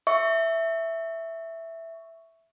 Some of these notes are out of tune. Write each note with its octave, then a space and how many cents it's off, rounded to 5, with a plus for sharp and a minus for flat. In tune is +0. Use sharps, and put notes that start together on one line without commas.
E5 +0 C#6 +5